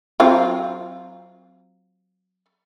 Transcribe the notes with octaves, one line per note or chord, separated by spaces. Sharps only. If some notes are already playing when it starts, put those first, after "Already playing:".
F#3 C4 F4